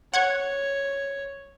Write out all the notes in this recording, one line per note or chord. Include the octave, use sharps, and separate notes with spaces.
C#5 F#5 G#6 C#7